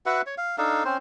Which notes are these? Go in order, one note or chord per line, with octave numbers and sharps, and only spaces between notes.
F#4 B4 E5 F#5
C#5
F5
D4 D#4 A4 F5
C4 C#4 C5